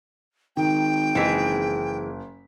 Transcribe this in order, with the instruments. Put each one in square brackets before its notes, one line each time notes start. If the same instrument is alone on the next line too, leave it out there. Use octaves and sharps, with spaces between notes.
[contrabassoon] G#1 [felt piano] D#3 [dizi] G5
[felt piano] F#1 B6 [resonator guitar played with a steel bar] E3 G#3 G#4